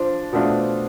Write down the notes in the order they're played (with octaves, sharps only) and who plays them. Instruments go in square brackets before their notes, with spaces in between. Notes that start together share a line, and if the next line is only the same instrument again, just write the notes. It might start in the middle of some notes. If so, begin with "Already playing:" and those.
Already playing: [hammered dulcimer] F3 [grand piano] D4
[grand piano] B2 A3 D4 F4